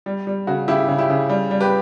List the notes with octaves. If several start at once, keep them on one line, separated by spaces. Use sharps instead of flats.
G3
G3
C#3 F#4
C#3 E4 G4
C#3
E4 G4
C#3
G3
G3
G4 B4